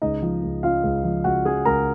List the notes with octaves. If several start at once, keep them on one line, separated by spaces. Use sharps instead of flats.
C#2 D#4 D#5
F3
C#2
C#3 F4 F5
C#2
F3
C#2 F#4 F#5
C#3 G#4 G#5
C#2 A#4 A#5